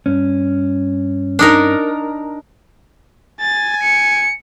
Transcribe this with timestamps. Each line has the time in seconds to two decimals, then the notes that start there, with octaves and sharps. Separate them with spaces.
0.06 G2 C#4
1.39 D4 D#4 A#4
3.41 G#5 A6
3.83 C#7